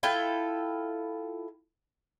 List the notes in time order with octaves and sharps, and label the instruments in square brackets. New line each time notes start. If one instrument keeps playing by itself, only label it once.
[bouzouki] E4 F4 A4 G5